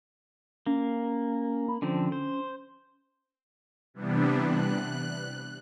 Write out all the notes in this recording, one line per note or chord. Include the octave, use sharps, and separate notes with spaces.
A#3 C#4
B5
D3 F3 C4 C#4
C5
C3 E3 G3 B3 D4
F#6